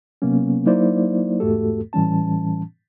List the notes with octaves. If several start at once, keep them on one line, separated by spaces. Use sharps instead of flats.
C3 F#3 A#3 B3 C#4
F#3 A#3 D#4 E4 C5 D5
E2 G#2 A3 F#4 G4 A4
A2 E3 G3 C#4 A5